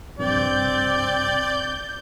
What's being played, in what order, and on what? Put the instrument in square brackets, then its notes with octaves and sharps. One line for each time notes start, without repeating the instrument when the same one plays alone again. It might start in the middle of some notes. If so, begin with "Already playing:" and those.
[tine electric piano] A#1 G2 C3 [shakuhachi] C4 [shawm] D5 [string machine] G6